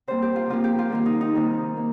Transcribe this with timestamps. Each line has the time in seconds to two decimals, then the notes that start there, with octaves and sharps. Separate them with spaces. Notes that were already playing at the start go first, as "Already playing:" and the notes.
0.07 C3 G3 A#3 C5
0.22 G4
0.36 F4
0.50 C3 F3 A#3 F4
0.64 G4
0.79 F4
0.90 D#3 G3 A#3 F4
1.06 D#4
1.21 D#4
1.34 C3 D#3 G3 A#3
1.77 A#3